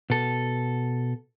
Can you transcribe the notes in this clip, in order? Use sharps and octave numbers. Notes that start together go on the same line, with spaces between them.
B2 A4